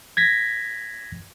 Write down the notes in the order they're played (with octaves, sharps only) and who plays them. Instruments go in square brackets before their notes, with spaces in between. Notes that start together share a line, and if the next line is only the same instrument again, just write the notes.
[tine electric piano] G#6 A#6 B6